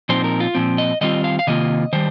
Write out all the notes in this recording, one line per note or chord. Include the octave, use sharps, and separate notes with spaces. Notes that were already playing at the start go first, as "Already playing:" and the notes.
A#2 F3 C4 D#4 C5
A#4
F4
A#2 F3 C4
D#5
D#3 G3 C4 F4 D#5
F5
F5
C3 D#3 A#3 F4 D#5
D#3 G3 C5